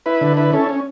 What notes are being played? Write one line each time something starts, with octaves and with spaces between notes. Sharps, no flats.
E4 B4
D3
E4 B4
C#4 A4
C#4